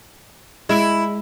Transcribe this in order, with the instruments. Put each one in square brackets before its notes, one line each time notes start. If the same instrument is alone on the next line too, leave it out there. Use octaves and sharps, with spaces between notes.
[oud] G#3 [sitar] E4